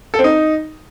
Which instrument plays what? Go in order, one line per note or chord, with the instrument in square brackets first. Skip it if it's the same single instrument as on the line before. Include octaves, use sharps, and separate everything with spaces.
[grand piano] A4
C4
D#4